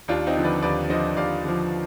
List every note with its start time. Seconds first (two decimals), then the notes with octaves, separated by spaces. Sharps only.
0.08 D#2 D4 F4
0.27 C4 D#4
0.36 D3 F3
0.44 B4 D5
0.62 D#2 B4 D5
0.89 D3 F3 C5 D#5
1.17 D#2 D5 F5
1.44 D3 F3